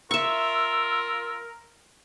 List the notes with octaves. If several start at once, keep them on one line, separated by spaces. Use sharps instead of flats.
F4 A#4 E5 C#6 E6